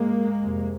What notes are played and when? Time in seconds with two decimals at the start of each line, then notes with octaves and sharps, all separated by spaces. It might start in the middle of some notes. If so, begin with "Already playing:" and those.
Already playing: G#2 G#3 A#3
0.40 F2 C3